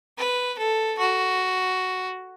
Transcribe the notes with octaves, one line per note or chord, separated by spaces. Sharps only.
B4
A4
F#4